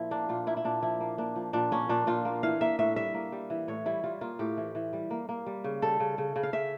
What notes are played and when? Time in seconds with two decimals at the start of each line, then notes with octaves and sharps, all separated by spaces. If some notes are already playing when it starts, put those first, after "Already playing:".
Already playing: A#2 F3 E4
0.11 A#3 D4
0.29 A#2 F4
0.47 A#3 E4
0.57 E4
0.64 A#2 D4
0.83 F3 E4
1.01 A#3
1.18 A#3 D4
1.36 F3
1.53 A#2 D4
1.72 A#3 C#4
1.89 A#2 D4
2.07 A#2 F4
2.25 A#3
2.43 E3 F5
2.61 A#3 E5
2.79 A2 E5
2.96 G3 E5
3.14 A#3
3.32 G3
3.50 E3
3.68 A2 C#5
3.86 G3 E4
4.04 G3 F4
4.21 A#3 F4
4.39 A2 G4
4.57 E3
4.75 E3
4.93 G3
5.11 A#3
5.29 A#3
5.47 G3
5.64 C#3
5.82 G3 A4
6.00 C#3
6.18 C#3
6.36 C#3
6.43 F5
6.53 C#3 E5